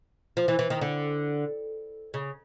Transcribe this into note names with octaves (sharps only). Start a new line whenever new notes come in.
F3
E3
E3
D#3
D3
C#3